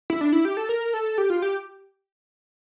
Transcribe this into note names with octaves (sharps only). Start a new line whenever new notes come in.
E4
D4
E4
G4
A4
A#4
A4
G4
F4
G4